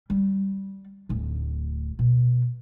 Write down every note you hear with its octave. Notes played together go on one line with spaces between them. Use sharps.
G3
D1 D2
B2